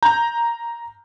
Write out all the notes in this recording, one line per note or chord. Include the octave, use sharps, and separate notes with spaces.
A#5 G6